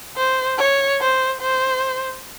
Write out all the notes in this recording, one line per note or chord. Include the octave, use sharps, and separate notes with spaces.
C5
C#5
C5
C5